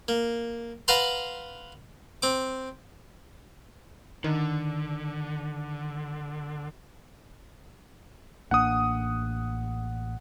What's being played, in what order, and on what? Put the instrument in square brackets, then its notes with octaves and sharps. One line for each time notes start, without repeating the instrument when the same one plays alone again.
[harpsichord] A#3
B4 F5 F#5 A5 A#5 C6
C4 D6
[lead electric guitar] D3 [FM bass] D#3
[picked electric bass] A1 A#3 D4 [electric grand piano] F#5 D#6